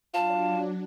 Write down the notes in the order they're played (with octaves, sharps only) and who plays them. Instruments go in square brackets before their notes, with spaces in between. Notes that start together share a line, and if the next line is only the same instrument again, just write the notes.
[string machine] F#3 D4 [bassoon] F4 [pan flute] A5